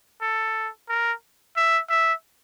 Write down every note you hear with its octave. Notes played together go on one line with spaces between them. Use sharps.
A4
A#4
E5
E5